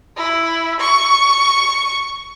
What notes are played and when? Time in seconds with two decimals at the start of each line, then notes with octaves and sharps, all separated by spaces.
0.17 E4
0.80 C#6